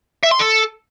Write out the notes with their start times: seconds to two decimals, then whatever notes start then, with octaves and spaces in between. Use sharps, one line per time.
0.23 E5
0.31 C6
0.39 A4